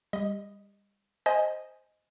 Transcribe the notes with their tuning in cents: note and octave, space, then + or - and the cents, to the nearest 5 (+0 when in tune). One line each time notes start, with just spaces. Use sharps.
G3 +35 D#5 +0
C5 +0 D#5 +0 G#5 +0